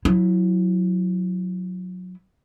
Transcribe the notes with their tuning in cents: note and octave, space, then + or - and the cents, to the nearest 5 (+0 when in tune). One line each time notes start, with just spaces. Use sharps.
F#3 -20 E4 +0